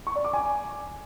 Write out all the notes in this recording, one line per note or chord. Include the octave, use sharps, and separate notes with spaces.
C#6
D5
D6
G#5